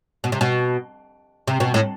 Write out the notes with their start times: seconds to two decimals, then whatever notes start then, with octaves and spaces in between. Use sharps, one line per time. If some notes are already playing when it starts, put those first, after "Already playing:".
0.24 B2
0.32 C3
0.41 B2
1.47 C3
1.60 B2
1.74 A2